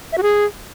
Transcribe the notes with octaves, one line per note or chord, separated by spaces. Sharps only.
E5
F#4
G#4